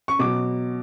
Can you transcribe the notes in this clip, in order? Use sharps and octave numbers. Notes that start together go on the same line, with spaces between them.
C#6
B2 F#3 D6